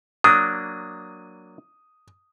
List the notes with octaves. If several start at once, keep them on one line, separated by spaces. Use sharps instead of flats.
F#3 A#3 D4 D#6